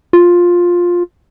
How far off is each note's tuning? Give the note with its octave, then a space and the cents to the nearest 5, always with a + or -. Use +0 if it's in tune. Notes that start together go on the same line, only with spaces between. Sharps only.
F4 +10